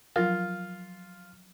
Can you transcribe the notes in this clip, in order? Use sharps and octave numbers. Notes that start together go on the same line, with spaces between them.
F3 F#3 F4 A#4